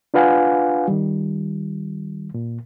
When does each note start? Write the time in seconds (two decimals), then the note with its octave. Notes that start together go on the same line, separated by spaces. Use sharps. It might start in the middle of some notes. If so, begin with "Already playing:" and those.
0.14 D4 F4 B4 F5 F#5 G#5
0.88 D#3 G3
2.34 A#2